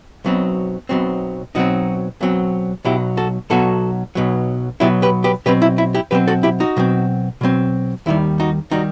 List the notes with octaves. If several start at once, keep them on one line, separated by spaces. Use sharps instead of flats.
B1 B2 F#3 C4
B1 B2 F#3 C4
B1 B2 F#3 C4 D#4 F#4
B1 B2 F#3 C4
B1 B2 F#3 E4 G4
F#4 A4
B1 B2 F#3 F#4 A4
B1 B2 F#3
B1 B2 F#3 E4 G4
G4 B4
G4 B4
B2 F#3 C4 G4 B4
E4
E4
E4 G4
B2 F#3 C4 G4 B4
F#4 A4
E4 G4
D#4 F#4
B2 F#3 C4
B2 F#3 C4
D#2 D#3 G3 E4
D#4 F#4
D#3 G3 D#4 F#4